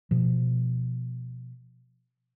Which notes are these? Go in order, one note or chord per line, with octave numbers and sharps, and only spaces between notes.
B2 F3